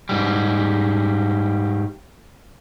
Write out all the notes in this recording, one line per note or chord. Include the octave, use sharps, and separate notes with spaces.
G#2 G3